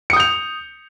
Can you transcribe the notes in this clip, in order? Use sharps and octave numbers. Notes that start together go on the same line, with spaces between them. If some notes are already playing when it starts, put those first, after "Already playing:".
D#6 G6 C#7 F7